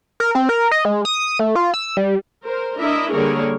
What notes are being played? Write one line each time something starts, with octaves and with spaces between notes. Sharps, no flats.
A#4
C4
A#4
D#5
G#3
D#6
A3
F4
E6
G3
A#4 C5
D4 E4 A#4 D#5 E5
D3 G3 A#3 G#4 A#4 C#5